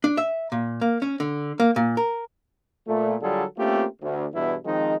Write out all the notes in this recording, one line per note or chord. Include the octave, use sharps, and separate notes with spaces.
D4
E5
A#2
A#3
C#4
D3
A#3
A#2
A#4
A#2 A3
D3 F#3 G3 F4 G#4 A4
A3 A#3 C4 C#4 F4 G4
D2
E2 G2 B2 E4
D#3 F3 G#3 C4 D#4